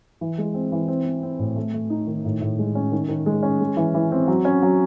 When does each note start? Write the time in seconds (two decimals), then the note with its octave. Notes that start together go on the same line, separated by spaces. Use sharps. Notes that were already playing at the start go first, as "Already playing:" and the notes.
0.21 E3
0.38 G#3
0.54 C4
0.72 E3
0.88 C4
1.05 C4
1.23 C4
1.39 A2
1.56 A3
1.74 A3
1.90 D#4
2.07 D#3
2.25 A2
2.41 A2
2.59 G#3
2.75 C#4
2.92 D#3
3.09 D#3
3.26 G#3
3.43 C#4
3.61 G#3
3.77 E3
3.95 E3
4.12 C4
4.28 F#3
4.45 C#4
4.63 F#3